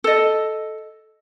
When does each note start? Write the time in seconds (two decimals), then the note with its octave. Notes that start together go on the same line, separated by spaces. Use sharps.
0.04 A4 D#5